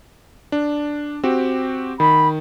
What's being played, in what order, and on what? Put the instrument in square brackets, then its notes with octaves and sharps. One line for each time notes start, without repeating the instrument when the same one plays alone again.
[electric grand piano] D4
C4 F#4 G4
[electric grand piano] D#3 [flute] B5